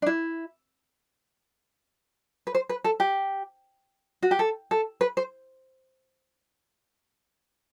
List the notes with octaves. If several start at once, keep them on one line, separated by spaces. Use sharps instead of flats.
D4
E4
B4
C5
B4
A4
G4
F#4
G4
A4
A4
B4
C5